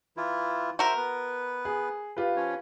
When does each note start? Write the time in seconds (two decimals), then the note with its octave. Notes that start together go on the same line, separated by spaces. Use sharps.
0.17 E3 E4 F4
0.79 F#4 A#4 C5 E5
0.97 B3 B4
1.65 G#4
2.17 F4 G4 B4
2.36 F3 C#4 C#5